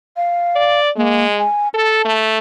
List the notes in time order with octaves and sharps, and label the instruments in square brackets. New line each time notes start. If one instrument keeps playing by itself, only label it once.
[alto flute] F5
[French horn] D5
[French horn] G#3 [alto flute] A#3
[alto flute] G#5
[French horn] A4 [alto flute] A5
[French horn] A3